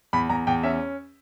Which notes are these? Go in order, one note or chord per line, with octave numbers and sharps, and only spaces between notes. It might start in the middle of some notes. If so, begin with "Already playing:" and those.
E2 B5
E2 A#5
E2 G5
C#4 E5